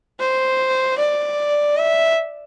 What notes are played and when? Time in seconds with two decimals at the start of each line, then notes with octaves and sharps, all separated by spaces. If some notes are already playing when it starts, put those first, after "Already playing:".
0.20 C5
0.99 D5
1.78 E5